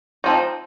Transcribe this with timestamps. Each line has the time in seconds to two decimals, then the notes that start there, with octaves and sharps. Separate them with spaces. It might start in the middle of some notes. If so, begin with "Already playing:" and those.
0.24 F3 C4 D#4